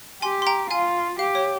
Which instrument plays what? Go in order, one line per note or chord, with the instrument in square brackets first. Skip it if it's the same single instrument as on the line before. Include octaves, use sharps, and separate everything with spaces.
[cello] G4 [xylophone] G#5 C6
[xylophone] C6
G5 A#5
[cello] F4 [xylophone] F5 G#5
[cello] G4 [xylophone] F5
[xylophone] C#5